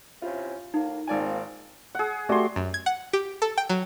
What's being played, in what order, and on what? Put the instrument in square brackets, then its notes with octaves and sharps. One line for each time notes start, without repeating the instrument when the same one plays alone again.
[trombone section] C3 C#4 E4 [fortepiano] F4
[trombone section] A2 A#3 [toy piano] D#4
[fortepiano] G#1 D5 G#5 [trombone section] A#3 C4 F4
[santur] G#4 F#5
[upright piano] A3 F#4 G4 [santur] D5 C6
[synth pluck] F#2
G#6
F#5
G4
A4
G5
F#3